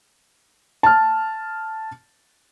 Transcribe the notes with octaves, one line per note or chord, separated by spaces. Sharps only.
A5 F6